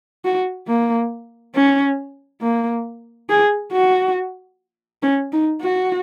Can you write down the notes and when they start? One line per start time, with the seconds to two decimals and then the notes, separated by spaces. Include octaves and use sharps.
0.25 F#4
0.68 A#3
1.55 C#4
2.42 A#3
3.29 G#4
3.73 F#4
5.03 C#4
5.32 D#4
5.61 F#4